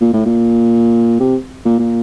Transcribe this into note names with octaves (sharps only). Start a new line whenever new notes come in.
A#2
A2
A#2
C3
A#2
A#2